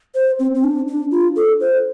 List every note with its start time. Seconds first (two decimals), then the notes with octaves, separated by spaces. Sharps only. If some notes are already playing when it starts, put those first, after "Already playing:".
0.15 C5
0.39 C4
0.55 C4
0.64 D4
0.88 D4
1.11 F4
1.36 A4
1.60 C5